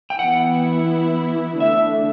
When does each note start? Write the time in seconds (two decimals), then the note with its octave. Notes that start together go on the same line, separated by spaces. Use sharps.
0.10 G5
0.19 E3 B3 E4 F#5
1.60 D3 A3 D4 E5